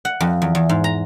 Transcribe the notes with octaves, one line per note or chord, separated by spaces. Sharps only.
F#5
F2
E2
E2
G#2
A#5